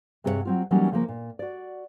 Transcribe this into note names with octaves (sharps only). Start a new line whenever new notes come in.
G2 C3 G#4 B4 C#5 F#5
F#3 C4 F4
E3 F#3 G3 A#3 C#4 D#4
C#3 F3 A#3
A#2
F#4 D5